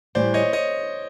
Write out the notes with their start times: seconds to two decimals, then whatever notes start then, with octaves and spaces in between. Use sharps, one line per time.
0.15 A2 E3 G3 C5 D5
0.34 C#5 D#5
0.53 C#5 D#5